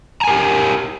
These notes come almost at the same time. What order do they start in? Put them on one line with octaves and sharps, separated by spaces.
A#5 G#5 A#4 G4